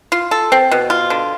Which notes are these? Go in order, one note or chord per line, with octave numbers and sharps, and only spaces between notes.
F4
A4
C4
B2
F4
D3